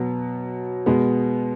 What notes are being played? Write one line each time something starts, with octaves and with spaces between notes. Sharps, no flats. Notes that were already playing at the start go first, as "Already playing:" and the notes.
Already playing: B2 F#3 B3
B2 G#3 B3